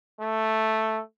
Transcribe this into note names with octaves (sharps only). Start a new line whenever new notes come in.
A3